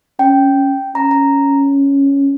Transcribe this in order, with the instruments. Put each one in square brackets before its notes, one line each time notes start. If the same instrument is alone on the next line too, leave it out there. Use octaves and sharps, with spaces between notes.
[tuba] C#4 [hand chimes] G5
[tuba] C#4 [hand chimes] A#5
[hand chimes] A#5